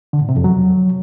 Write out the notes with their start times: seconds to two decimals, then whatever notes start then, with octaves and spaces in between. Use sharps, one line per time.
0.13 D3
0.21 A2
0.29 C3
0.36 F2
0.44 F#3